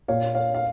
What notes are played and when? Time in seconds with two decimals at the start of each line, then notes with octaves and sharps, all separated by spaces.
0.08 A#2 C#5 F5
0.35 C#5 F5
0.54 F5